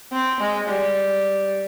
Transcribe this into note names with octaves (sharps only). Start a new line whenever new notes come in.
C4
G#3
G3